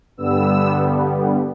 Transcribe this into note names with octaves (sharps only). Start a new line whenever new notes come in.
G2 D3 G3 B3 E6